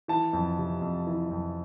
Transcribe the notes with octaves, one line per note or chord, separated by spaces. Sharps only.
E3 A5
F2
C3
F2
E3
F2